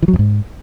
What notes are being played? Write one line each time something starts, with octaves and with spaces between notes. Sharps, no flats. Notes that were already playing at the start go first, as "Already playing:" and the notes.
E3
F#3
F2
G#2